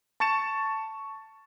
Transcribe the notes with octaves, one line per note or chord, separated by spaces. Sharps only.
A5 C#6 A6 C#7 E7